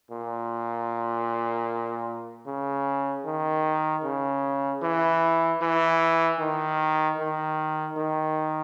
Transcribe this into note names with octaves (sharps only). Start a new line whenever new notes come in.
A#2
C#3
D#3
C#3
E3
E3
D#3
D#3
D#3